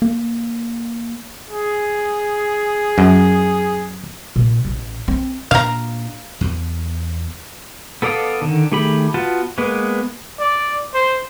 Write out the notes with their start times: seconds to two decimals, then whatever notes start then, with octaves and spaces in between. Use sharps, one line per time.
0.02 A#3
1.48 G#4
2.98 F#2
4.36 A#2
4.65 A1
5.08 C4
5.51 A#2 C4 D4 F5 A#5
6.41 E2
8.02 B3 A4 D5 F5 D#6
8.42 D3 D#3
8.72 D#3 A3 G4 G#4 B5
9.14 B3 F4 F#4 A5
9.58 G#3 A#3 B3 B4
10.40 D5
10.94 C5